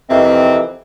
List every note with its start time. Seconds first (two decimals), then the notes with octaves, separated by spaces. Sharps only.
0.10 F2 C3 D#3 E3 C4